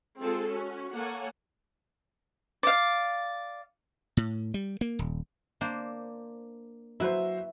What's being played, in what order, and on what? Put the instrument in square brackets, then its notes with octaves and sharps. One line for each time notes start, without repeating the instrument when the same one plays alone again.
[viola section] G#3 C4 F4 G#4 A4
C#4 F#4
A#3 A4 C#5 F#5 G#5
[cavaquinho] D5 F5
[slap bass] A2
G3
A#3
D#1
[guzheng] A#3 D4 C5
[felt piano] F#3 C5 [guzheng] E4 B4 [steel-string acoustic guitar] E5